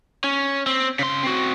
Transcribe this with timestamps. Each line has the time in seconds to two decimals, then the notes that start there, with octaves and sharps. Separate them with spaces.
0.24 C#4
0.66 C4
0.99 C#3 C6
1.23 C4 F#4